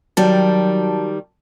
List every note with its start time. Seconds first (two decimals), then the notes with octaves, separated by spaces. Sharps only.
0.17 D#3 F#3 G3 A5